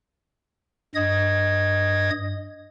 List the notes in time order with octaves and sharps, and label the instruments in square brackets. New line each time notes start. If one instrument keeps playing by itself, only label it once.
[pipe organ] G2 D#5 D#6 G#6